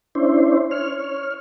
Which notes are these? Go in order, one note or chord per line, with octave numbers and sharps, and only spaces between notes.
C#4 D4 E4 C5
C#5 F6